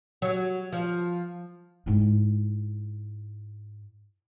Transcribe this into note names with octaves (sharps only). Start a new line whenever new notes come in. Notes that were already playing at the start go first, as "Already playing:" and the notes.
F#3
F3
G#2 E4